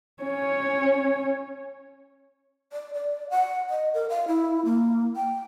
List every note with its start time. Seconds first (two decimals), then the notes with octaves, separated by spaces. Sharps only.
0.23 C#4 C#5
2.73 D5
2.94 D5
3.30 F#5
3.70 D#5
3.94 A#4
4.10 F5
4.28 E4
4.65 A#3
5.16 G5